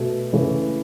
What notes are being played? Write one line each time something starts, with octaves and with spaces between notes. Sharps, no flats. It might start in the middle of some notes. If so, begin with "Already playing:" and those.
Already playing: B2 A3
C#3 E3 A3